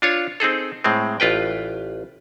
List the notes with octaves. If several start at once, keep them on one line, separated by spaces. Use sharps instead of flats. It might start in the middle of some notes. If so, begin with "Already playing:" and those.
D4 F4 C#5
C4 D#4 G#4 A4
A2 G#3 C4
A1 F4 B4 G5